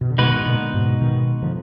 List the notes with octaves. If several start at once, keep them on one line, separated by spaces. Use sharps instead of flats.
B2
D3
B2 D#3 G#3 B3 D#4 F#4 B4
B2
A#2 D3
G#2 B2
B2 D#3
D3 F3